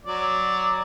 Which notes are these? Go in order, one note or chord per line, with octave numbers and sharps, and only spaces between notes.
F#3 D5